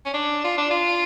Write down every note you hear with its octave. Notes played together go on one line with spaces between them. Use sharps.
C#4
D4
F4
D4
F4